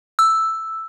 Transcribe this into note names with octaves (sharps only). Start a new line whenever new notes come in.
E6